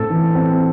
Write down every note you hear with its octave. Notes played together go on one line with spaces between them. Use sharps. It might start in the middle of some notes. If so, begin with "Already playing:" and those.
Already playing: A2 A3 C4 A4
E3
C4